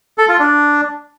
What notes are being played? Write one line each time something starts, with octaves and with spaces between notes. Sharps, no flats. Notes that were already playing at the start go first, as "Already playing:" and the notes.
A4
F4
D4